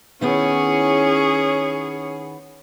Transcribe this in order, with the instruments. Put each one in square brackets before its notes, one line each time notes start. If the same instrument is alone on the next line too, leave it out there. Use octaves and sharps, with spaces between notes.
[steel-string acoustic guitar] D#3 B3 E4 [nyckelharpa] C#4 C#5 [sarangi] G#4